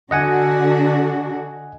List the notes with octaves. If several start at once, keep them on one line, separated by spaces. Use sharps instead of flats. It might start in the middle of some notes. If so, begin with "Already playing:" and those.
D3 F#4 D#5 F#5 G#5